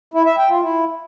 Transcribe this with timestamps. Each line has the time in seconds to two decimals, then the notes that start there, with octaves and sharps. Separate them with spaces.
0.14 E4
0.26 E5
0.38 G5
0.50 F4
0.62 E4